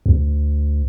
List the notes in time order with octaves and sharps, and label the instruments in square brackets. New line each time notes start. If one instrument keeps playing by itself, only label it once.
[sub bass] D2